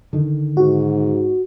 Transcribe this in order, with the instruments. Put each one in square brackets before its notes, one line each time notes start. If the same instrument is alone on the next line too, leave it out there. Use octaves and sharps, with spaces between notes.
[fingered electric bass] D3 D#3
[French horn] G#2 [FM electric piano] F#4